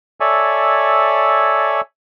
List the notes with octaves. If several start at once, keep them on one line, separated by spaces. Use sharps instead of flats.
A4 C#5 D5 E5 G#5